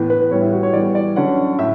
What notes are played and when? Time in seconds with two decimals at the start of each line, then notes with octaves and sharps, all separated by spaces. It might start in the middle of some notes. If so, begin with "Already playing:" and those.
Already playing: A2 E3 B3
0.10 B4
0.31 A2 G3 B3 C#5
0.42 E4
0.52 F#4
0.63 C#5
0.73 E3 G3 B3 D5
0.95 D5
1.16 D3 F#3 C#4 F#5
1.59 A2 E5